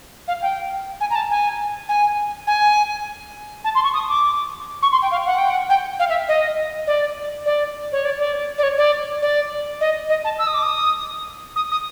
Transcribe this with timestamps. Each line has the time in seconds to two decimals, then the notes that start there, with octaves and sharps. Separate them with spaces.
0.27 F5
0.42 G5
1.00 G#5
1.10 A#5
1.15 A5
1.30 G#5
1.88 G#5
2.47 G#5
3.64 A5
3.75 C6
3.84 C#6
3.94 D#6
4.08 D6
4.82 C#6
4.92 C6
5.02 G5
5.11 F5
5.26 F#5
5.38 G5
5.50 F#5
5.69 G5
5.99 F5
6.09 E5
6.28 D#5
6.87 D5
7.45 D5
7.92 C#5
8.05 D5
8.19 D5
8.58 D5
8.63 C#5
8.77 D5
9.22 D5
9.80 D#5
10.09 D#5
10.24 A5
10.38 E6
10.47 D#6
10.54 D6
10.62 D#6
11.56 D#6
11.71 D#6